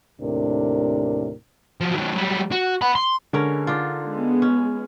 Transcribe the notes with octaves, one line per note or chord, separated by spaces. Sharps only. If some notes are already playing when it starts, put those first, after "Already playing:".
D#2 A2 C3 D4 A#4
F3 F#3
D#3 F#3
F#3 G3
F#4
F#5 B5
C6
D3 G#3 C#4 A#4
D4 D#4 F4
G#3 B3
C#4